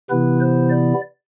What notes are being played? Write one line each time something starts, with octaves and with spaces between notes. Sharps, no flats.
C3 E3 B3 E4 B4
C5
D5